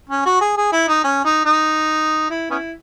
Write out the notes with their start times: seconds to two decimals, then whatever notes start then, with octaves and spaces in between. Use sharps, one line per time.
0.10 C#4
0.25 F#4
0.41 G#4
0.57 G#4
0.72 E4
0.88 D#4
1.04 C#4
1.25 D#4
1.45 D#4
2.30 E4
2.50 B3 C#4 E4